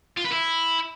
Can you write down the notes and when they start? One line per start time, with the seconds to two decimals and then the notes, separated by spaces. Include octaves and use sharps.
0.17 F4
0.25 B4
0.32 E4